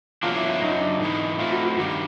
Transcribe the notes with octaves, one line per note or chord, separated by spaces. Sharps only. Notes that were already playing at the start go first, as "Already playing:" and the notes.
E2 C#3 F#3 A#3 D4 F4
E4
E4
F#2 C#3 F#3 D#4
D#4
D4
G#2 E3 G#3 D#4
A3 C4 E4 F4
F#4
F#4
G2 D#3 G3 F#4